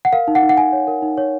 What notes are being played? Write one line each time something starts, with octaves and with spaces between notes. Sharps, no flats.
F#5
A#4 F5
D#4
F#5
D#4
F#5
D#4 G#5
C#5
A#4
D#4
C#5